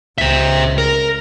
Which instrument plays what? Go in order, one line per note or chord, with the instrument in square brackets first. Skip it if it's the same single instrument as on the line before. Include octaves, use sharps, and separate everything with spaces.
[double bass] C#2 [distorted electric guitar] C5 E5
[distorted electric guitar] A#4